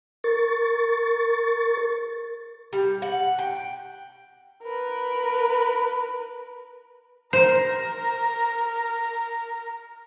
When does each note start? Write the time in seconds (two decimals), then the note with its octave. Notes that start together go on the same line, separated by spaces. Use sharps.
0.24 A#4 C#6 A6
2.73 G3
3.02 F#5
3.39 G5
4.63 A#4 B4
7.33 A#4 C5